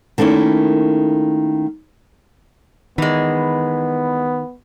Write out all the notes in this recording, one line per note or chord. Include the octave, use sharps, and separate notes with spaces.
D#3 A3 A#3 C#4 E4
D#3 E3 G#3 B3